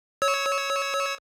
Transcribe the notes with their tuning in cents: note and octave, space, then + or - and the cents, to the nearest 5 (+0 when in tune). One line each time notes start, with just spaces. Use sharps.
C#5 +0 E6 -30